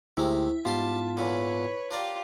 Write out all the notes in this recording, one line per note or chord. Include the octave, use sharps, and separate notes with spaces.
D2 C3 D#3 G#3 E4 G4
G#2 G3 B3 F4 G4 A5 C6
E2 A#2 D3 B4 C#5
D4 F4 G4 A#4 D5